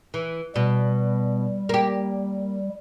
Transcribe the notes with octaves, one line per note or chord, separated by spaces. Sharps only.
E3
B2 G3
A#3 G4